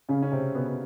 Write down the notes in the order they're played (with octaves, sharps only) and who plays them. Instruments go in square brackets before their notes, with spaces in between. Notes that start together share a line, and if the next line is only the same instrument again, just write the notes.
[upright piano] C#3 C#4
C#4
C3 C4
B2 B3
B3